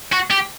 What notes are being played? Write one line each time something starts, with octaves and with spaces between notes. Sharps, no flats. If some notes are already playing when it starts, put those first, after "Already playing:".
F#4
G4